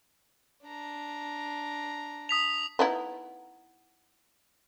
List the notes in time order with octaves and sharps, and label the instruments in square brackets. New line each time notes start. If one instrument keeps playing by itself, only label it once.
[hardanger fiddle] D4 A#5
[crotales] D#6 B6 F7
[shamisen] B3 D#4 E4